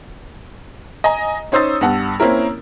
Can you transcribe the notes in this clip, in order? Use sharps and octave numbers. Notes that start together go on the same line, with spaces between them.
D#5 G#5 A#5
C#4 D#4 C5 D#6 E6 A6
G2 B3 F#5 A5
A#3 C4 C#4 E4 A#4